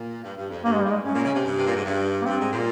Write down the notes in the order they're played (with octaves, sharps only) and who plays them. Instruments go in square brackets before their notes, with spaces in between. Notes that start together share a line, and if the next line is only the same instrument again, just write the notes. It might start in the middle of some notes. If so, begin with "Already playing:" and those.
Already playing: [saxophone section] A#2
G2
G2
F2
[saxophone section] G2 [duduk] A#3
[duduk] G#3
[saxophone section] G#2 [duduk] G3
[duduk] G#3
[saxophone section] G2 [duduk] C#4
[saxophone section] A#2
C#3
C3
G2
C3
A#2
G#2
G2
[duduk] A#3
[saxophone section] G2 [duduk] C4
[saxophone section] G#2
A#2